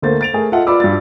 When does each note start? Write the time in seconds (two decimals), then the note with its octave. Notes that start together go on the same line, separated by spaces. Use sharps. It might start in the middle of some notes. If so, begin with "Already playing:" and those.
0.02 D2 A3 A#3 C5 A6
0.21 A6 D7 F7
0.33 A3 G#4 A#4
0.52 F4 A4 D#5 E5 F#5
0.67 F4 B4 D5 B5 D6 E6
0.80 G2 F#4 A6